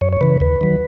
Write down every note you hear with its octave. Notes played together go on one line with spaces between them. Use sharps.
F#2 C#5
C#5
C#3 E3 B4
D#2 B4
D#3 F#3